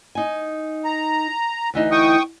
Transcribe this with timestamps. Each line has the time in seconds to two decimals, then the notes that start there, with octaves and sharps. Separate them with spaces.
0.15 D#4 G#5
0.85 A#5
1.74 D2 E3 D#4
1.91 G5 C#6 D#6